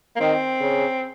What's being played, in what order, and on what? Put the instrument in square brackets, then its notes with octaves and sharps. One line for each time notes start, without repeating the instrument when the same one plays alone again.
[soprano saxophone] A#3
[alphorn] D#3 [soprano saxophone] C4
[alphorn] C#3